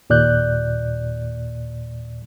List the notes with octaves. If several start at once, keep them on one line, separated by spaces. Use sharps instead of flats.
D#2 A#2 D5 F#6 G6